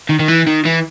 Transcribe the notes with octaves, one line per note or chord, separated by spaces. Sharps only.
D#3
D#3
E3
D#3
E3